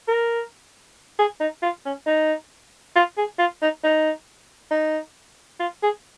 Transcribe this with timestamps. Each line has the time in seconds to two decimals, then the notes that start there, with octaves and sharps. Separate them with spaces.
0.08 A#4
1.19 G#4
1.40 D#4
1.63 F4
1.85 C#4
2.07 D#4
2.96 F4
3.17 G#4
3.39 F4
3.62 D#4
3.84 D#4
4.71 D#4
5.60 F4
5.83 G#4